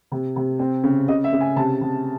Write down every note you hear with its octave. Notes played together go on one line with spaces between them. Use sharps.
C3
C3
C4
C#3
C#3 D#5
E5
C#3
G#5
C3 A5
C3